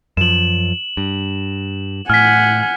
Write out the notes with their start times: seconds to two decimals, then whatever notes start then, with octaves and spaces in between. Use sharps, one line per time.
0.17 F#2 F3 E7 F#7
0.97 G2
2.10 A2 F#5 G#5 F6 B6